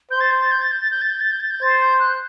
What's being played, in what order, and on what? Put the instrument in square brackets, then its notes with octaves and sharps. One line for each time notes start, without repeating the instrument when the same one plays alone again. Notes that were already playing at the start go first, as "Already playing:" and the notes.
[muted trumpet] C5 [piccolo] G6
[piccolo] A6
G6
A6
G6
A6
G6
A6
G6
A6
G6
A6
G6
A6
G6
[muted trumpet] C5 [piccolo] A6
[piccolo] G6
F#6